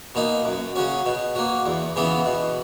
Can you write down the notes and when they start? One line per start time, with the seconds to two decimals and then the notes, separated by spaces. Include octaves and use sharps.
0.15 B2 A#3 D#4
0.45 F#2
0.76 C#3 F#3 C#4
1.06 B2
1.35 F#3 A#3
1.66 E2
1.96 C#3 E3 B3
2.25 B2